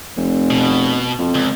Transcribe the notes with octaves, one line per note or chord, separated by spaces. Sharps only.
F1
B2
F2
C#2